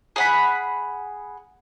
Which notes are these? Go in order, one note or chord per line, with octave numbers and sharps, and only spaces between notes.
G#4 F#5 B5